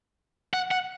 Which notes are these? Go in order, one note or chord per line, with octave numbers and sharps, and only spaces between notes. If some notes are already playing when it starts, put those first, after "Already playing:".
F#5
F#5